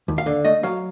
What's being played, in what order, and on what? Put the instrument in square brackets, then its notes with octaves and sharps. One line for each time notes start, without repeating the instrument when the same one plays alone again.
[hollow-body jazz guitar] D#2
F5
D3
A3 D#5
F#3 F5